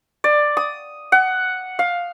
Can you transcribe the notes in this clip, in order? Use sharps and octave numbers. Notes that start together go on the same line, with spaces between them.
D5
D#6
F#5
F5